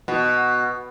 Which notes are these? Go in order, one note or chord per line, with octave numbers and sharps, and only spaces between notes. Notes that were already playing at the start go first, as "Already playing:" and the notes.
B2